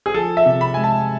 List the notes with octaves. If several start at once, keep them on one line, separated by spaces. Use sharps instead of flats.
G#4
F3 A4
E5
C3
B5
G#3 G#5
A5